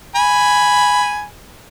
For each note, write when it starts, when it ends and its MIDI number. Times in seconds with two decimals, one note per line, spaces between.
0.15 1.24 80
0.15 1.24 83